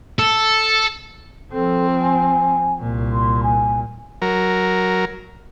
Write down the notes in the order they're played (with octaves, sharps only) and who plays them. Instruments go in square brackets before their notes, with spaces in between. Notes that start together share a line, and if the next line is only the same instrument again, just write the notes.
[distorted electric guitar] A4
[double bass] F3 C4 [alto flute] A4
[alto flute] G#5
[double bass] C2 A#2
[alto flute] C6
G#5
[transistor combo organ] F#3 A#4